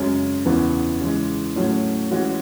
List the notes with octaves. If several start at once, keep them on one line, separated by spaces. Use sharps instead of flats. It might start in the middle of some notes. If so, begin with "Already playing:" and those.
Already playing: F#2 C#3 G#3 C#4
E2 C#3 E3 B3
C#3 E3 G#3
A2 F#3 C#4
E3 G#3 C#4 F#4